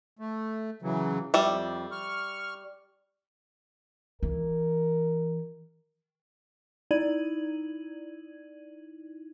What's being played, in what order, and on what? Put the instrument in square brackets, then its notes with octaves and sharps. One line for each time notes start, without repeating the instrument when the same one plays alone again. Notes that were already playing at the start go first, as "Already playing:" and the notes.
[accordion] A3
C#3 E3 F#3
[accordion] F2 [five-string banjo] G3 E5
[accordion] C#6 F6
[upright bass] E3 [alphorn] A#4
[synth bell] D#4 E4 D5 G#6 D#7 F#7